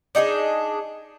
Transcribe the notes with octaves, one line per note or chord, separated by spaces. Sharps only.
D4 D#4 G4 G#4